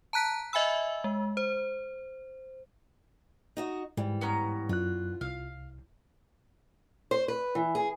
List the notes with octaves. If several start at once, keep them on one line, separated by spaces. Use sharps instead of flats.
A5 A#5 F#6 B6
D#5 E5 G#5 B5 E6
G#3
C5
D#4 F#4 D#5
G#2 E3 G3
B3 C#4 A#5
F#2 F4 F#6
C2 F5
C5
B4
E3
G#4